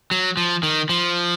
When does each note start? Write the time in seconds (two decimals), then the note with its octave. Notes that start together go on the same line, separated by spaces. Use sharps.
0.11 F#3
0.37 F3
0.63 D#3
0.89 F3